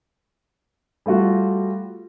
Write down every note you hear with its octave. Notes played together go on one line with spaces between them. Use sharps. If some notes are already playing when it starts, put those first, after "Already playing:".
G3 A3 F4 F#4